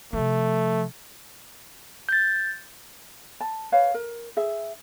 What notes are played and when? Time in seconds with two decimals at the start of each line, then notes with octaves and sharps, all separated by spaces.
0.13 C3 F3 A3
2.09 G6 A6
3.40 A5
3.72 B4 C#5 F5
3.94 A#4
4.37 G#4 E5